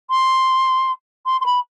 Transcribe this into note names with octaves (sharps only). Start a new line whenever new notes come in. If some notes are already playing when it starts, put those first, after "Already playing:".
C6
C6
C6
B5